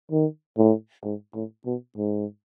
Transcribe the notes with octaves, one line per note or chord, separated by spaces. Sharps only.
D#3
A2
G#2
A2
B2
G#2